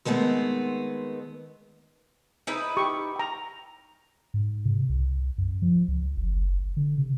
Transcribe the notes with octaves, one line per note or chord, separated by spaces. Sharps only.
D#3 G#3 A3 B3 C4
D#4 E4 B4
G4 C#6
G5 A#5
G#2
C3
C2
F#2
F3
C#2
F#1
D3
C3